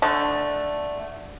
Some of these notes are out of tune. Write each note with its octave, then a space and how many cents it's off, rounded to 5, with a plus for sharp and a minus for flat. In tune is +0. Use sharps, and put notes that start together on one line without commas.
D3 +0 A3 +0